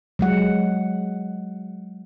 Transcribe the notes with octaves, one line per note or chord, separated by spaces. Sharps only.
F#3 G#3 F#5